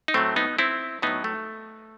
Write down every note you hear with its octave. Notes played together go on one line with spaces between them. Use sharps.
D#4
A2 F#3 A3 C4
B3 D#4
C4 E4
A2 F#3 B3 D#4
A3